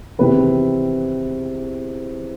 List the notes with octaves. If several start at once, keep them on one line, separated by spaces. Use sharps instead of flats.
E2 C3 D#3 B4